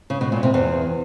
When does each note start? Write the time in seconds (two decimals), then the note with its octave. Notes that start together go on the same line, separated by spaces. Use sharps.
0.10 C#3
0.21 B2
0.32 A#2
0.43 C3
0.54 E2